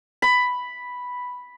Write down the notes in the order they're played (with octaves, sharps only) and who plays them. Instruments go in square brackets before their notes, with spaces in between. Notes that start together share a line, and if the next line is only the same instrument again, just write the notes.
[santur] B5